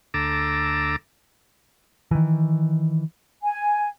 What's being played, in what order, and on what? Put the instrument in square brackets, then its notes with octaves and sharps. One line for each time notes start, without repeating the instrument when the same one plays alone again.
[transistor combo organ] D2 A4 A#5 D6 E6
[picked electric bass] D#3 E3
[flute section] G#5